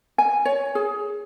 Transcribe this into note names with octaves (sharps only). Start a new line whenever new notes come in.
G#5
C#5
G#4